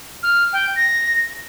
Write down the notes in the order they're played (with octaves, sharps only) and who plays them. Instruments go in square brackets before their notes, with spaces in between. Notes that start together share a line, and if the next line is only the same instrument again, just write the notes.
[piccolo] F6
G5
A#6